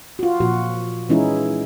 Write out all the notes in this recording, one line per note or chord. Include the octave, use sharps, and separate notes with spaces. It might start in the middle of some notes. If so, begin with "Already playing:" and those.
F4 F#4
A#2 F3 F#4
E3 G#3 C#4 D#4 E4 G#4